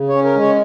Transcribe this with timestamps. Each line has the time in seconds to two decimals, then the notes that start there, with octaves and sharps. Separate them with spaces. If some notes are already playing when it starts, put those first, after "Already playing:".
Already playing: C#3
0.09 C#4 C#5
0.24 A#4
0.35 G#3 C#5